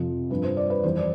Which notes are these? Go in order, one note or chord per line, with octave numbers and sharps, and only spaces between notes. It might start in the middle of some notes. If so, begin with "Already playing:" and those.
Already playing: F2 C3 F3
G2 F3 B4
C5
D5
B4
F2 E3 G3 C5
D5